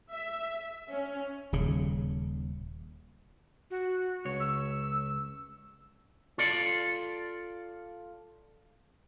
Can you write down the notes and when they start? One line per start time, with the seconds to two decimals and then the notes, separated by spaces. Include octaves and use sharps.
0.13 E5
0.90 C#4
1.52 D#1 C#3
3.71 F#4
4.25 C#2 C#5
4.40 E6
6.38 F4 A4 D5